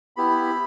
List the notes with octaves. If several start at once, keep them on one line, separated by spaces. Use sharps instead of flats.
B3 E4 G4 B5